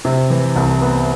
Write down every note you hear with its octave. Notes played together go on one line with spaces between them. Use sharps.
C3
E3
C2
B3